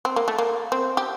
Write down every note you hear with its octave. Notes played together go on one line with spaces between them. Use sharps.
C4
A#3
A3
A#3
C4
G4